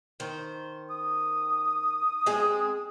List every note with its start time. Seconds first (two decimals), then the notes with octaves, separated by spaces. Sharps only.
0.20 D#3 C5
0.90 D#6
2.26 G#3 C4 G#4